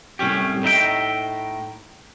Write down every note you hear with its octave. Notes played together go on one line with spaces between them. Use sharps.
C2 A2 C#4 G4
A2 D#4 E5 G5